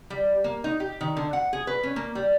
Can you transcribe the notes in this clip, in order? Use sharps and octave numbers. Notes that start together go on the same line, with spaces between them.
G3
A#3
D#4
G4
D#3
D3
F#5
G#4
B4
C#4
A#3
G3